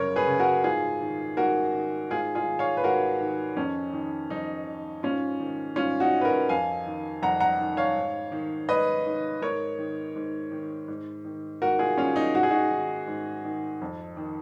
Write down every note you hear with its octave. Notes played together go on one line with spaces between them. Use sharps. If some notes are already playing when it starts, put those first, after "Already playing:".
Already playing: F#2 C#3 A#4 C#5
G#4 B4
C#3
F#4 A#4
G#2 F4 G#4
D#3
G#2 F#4 A#4
D#3
G#2 F4 G#4
F4 G#4
D#3
C#5 F5
B4
G#2 F#4 A#4
D#3
F2 C#4
D#3
F2 D#4
D#3
G#2 C#4 F4
D#3
G#2 C#4 F4
D#4 F#4
D#3
B4
F#4 A#4
F2 F5 G#5
D#3
F2 F#5 A#5
F#5 A#5
D#3
C#5 F5
G#2
D#3
G#2 B4 D#5
D#3
G#2 A#4 C#5
D#3
G#2
D#3
G#2
D#3
G#2 F#4 A#4
F4 G#4
D#3 C#4 F4
D#4
G#2 F#4
G#4
D#4 F#4
D#3
G#2
D#3
F2
D#3